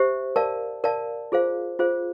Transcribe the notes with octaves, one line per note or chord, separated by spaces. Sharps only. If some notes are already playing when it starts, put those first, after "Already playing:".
Already playing: G4 C5 E5
A#4 D5 F5 A5
A#4 D5 F5 A5
F4 G#4 C5 F5
F4 G#4 C5 F5